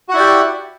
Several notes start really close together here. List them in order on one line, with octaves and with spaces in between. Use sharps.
F#4 F#5 E4 D5 G4